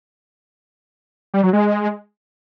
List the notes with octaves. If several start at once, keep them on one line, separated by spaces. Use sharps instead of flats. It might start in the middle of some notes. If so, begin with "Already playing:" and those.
G3
F#3
G#3